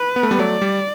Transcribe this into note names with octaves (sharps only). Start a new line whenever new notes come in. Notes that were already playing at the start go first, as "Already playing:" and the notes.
Already playing: B4
B3
A3
G3 B3
F#3 A3 D5
G3